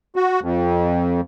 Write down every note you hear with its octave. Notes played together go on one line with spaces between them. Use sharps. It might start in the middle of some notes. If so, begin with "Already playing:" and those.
F#4
F2